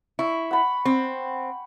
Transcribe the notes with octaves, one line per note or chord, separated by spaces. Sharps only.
E4 C#6
F#5 B5
C4